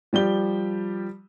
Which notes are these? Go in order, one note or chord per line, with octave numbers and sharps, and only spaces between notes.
F3 G3 G4 G7